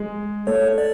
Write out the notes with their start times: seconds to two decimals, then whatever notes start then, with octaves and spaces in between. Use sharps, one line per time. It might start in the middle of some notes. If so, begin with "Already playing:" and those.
Already playing: G#3
0.47 A3 C#5
0.78 D5